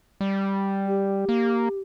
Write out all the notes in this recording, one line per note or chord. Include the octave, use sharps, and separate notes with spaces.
G3
G4
A#3